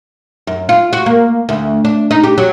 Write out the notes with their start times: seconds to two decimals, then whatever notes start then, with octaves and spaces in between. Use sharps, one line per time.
0.47 F#2
0.69 F4
0.93 F#4
1.06 A#3
1.49 D2
1.85 D4
2.11 D#4
2.24 G4
2.38 F#3